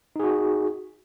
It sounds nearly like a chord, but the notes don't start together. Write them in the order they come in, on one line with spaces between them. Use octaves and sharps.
D#4 G#4 F#4